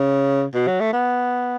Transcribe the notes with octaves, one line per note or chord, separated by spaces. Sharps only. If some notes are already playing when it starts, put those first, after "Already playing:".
Already playing: C#3
B2
F#3
A3
B3